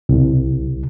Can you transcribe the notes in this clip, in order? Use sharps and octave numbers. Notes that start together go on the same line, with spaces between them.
C2